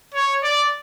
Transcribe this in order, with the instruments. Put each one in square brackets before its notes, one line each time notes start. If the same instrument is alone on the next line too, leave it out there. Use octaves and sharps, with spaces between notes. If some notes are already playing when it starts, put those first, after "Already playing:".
[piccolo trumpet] C#5
D5